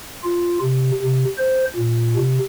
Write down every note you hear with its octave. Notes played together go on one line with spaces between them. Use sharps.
F4
C3
C3
C5
A#2
C3